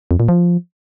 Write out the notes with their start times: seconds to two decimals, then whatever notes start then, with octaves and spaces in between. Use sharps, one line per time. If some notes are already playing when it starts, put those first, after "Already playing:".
0.11 F2
0.20 A#2
0.29 F3